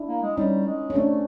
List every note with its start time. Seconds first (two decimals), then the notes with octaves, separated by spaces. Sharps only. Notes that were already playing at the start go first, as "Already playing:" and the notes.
Already playing: D4 E4
0.08 A#3
0.23 G#3
0.37 G3 C#4 D#4
0.67 G#3
0.90 C#4
0.95 A3 C4 D4